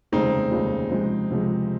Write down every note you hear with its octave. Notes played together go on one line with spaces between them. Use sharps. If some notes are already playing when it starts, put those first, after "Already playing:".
F1 D#2 C#3 G#3 C4 D#4
F1 D#2 C#3 G#3
C#2 C3 F3 G#3
C#2 C3 F3 G#3